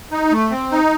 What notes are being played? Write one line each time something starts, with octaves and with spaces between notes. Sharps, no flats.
D#4
A3
C4
D#4